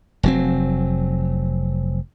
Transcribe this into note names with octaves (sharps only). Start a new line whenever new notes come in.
F1 F#3 C4